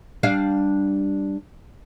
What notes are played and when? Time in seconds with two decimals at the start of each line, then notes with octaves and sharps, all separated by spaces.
0.23 G3 D4 F5